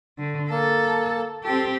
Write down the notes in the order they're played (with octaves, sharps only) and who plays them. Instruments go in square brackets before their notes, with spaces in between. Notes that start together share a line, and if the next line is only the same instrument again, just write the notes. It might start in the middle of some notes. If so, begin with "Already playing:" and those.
[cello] D3
[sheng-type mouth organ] A#3 A5 [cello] A4
[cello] C4 G4 [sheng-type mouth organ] A4